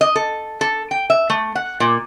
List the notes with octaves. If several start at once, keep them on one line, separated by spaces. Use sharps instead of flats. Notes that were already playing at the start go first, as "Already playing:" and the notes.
D#5
A4
A4
G5
E5
A3
F#5
A#2